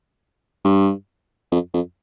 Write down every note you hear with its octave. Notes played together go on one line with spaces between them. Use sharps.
G2
F2
F2